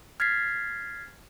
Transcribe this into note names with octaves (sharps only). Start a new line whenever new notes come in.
F6 G#6 A6 B6 C7